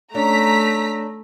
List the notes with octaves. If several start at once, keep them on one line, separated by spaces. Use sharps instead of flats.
A3 C#4 D4 A#5 B6